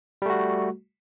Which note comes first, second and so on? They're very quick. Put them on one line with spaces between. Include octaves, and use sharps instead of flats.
G3 A3 F#4